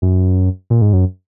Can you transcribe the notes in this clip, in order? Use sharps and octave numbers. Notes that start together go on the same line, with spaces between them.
F#2
A#2
G#2
F#2